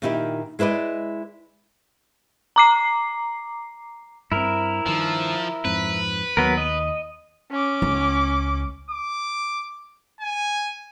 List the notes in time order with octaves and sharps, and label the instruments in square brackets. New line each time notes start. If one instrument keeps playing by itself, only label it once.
[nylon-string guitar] A#2 D#3 D#4 E4 G4
G#3 E4 B4 D5 D#5
[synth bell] A#5 D6 C7
[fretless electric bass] G2 C4 [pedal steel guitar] E4 A#4
[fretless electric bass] G2 D#3 [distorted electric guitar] F3
[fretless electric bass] F2 G#2 C4 [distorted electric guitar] B4
[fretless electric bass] D#2 [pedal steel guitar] F#3 B3 A#4
[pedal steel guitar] D#5
[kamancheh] C#4 D6
[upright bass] C#2
[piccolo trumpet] D6
G#5